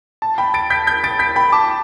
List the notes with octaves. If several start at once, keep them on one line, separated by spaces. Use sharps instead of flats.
A5
G5 B5
A6 D7
G6 B6
G6 B6
A6 D7
G6 B6
G5 B5
A5 D6